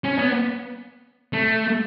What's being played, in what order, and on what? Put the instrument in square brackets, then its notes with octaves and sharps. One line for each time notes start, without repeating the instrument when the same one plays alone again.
[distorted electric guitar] C#4
B3
A3